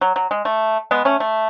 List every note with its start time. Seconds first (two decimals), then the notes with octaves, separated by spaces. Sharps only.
0.01 F#3
0.16 F#3
0.31 G#3
0.45 A3
0.91 G#3 B3
1.05 A3 C#4
1.20 A3